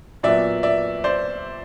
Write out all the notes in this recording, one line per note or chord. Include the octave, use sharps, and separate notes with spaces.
A#2 F#3 B3 D5 E5
D5 E5
C5 D5